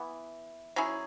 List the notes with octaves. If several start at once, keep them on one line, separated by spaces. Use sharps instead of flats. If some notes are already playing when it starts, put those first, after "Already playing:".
Already playing: E3 B3
F#3 C#4 E4 G#4